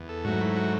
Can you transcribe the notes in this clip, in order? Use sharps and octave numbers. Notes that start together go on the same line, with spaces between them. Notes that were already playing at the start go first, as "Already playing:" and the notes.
Already playing: E2
A4
G#2 F#3 A3 F#4
E4
F#4